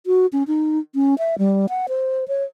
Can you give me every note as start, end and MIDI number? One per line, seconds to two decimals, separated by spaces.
0.06 0.26 66
0.33 0.43 61
0.47 0.79 63
0.95 1.18 61
1.18 1.35 76
1.39 1.66 55
1.69 1.86 78
1.89 2.28 72
2.28 2.44 73